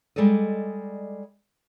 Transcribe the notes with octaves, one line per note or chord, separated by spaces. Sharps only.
G3 G#3 A4 D5 D#5